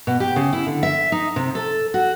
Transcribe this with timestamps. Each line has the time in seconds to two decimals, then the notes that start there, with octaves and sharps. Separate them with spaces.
0.07 B2
0.20 G4
0.36 C#3
0.53 E4
0.66 D3
0.83 E5
1.12 D#4
1.36 C3
1.55 A4
1.94 F#4